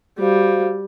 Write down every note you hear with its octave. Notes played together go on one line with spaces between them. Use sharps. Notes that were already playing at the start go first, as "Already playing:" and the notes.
G3 F#4 C5 F5